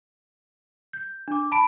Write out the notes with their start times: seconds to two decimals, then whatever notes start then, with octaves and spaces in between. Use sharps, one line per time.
0.93 G6
1.28 D4 D6
1.52 A5 B5 D7